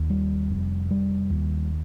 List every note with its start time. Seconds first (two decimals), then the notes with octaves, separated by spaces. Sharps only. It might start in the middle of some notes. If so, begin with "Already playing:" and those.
Already playing: D#2
0.10 G3
0.50 F1
0.91 G3
1.30 D#2